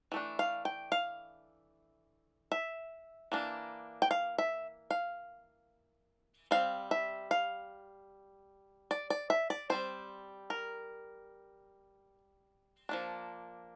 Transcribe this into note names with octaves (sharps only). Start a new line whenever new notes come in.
E3 A3 D4
F5
G5
F5
E5
E3 A#3 D4
G5
F5
E5
F5
G3 C4 F5
E5
F5
D5
D5
E5
D5
G3 C4 C5
A#4
F3 A#3 D4